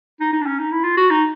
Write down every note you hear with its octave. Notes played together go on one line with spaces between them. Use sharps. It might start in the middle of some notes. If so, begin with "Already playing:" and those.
D#4
D#4
D4
C#4
D#4
E4
F4
F#4
D#4